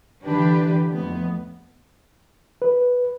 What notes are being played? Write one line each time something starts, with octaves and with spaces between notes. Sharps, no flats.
D3 E3 D4 G4 B4
F2 A2 B3
B4